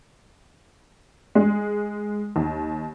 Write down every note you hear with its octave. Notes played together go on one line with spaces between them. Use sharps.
G#3
D#2